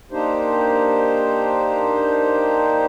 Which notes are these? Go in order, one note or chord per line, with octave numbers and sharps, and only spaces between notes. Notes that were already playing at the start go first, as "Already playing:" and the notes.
A#3 D4 D#4 G4 C5